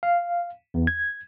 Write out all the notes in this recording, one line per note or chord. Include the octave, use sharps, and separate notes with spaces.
F5
E2
G#6